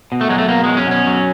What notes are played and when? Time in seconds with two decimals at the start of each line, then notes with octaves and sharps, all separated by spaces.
0.12 B2
0.21 A3
0.29 F#3 G#3
0.38 A3
0.49 B2 A#3
0.64 F#3 G#3
0.77 C#4
0.87 B2 C#4
1.07 F#3